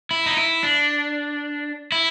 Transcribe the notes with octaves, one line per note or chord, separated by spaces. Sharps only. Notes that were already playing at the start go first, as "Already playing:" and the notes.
E4
D#4
E4
D4
E4